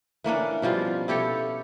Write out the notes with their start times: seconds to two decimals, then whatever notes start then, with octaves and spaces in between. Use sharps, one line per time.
0.24 E3 A#3 C#4 D4
0.62 B2 F3 G3 F4
1.08 E4 G4 A4 C#5